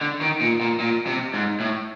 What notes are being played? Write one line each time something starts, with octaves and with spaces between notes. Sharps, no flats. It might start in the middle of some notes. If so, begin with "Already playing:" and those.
D3
D#3
A#2
A#2
A#2
C3
G#2
A2